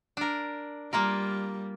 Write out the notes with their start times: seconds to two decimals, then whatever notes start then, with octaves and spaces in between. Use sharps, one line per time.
0.17 D4 A#4
0.93 G3 A#3 F4 A#4